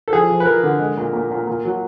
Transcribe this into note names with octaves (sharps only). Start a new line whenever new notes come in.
A4
F3 G#4
F3
B4
F3 A#4
D3
G#3
A#2
A#2
A#2
A#2
F#3